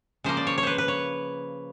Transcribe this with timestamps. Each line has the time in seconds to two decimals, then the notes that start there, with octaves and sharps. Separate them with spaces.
0.24 C#3 F3 A#3 C5
0.37 D5
0.47 C#5
0.58 C#5
0.63 B4 C5
0.78 B4
0.88 C#5